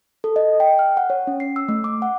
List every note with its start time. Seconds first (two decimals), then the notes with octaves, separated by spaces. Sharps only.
0.24 A4
0.36 D#5
0.60 G5
0.79 F6
0.97 F#5
1.10 C#5
1.27 C#4
1.40 C7
1.56 E6
1.69 A3
1.84 D6
2.02 F#5